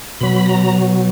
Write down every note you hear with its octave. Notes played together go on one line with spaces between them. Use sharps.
B2 F#3 B5
A#5